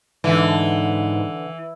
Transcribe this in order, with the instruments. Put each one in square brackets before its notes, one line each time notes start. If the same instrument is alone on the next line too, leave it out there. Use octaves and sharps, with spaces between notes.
[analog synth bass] G#2 [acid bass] D3 [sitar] E3